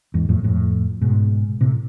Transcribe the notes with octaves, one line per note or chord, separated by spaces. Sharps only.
E2 G#2
F2 A2
F2 A2
G#2 B2
A2 C3